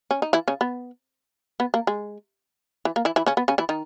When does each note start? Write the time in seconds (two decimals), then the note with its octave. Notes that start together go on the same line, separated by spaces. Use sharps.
0.11 C#4
0.22 D#4
0.33 E3 E4
0.48 C#3 C#4
0.61 B3
1.60 B3
1.74 A#3
1.87 G#3
2.85 E3
2.96 A#3
3.05 E3 E4
3.16 E3 E4
3.27 C#3 C#4
3.37 B3
3.48 C#3 C#4
3.58 E3 E4
3.69 D#3 D#4